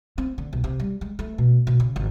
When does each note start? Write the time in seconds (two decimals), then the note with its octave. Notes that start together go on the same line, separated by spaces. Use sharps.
0.18 C4
0.38 D3
0.53 B1
0.64 C3
0.80 G3
1.01 G#3
1.19 A3
1.38 B2
1.67 B2
1.80 C#3
1.96 G#1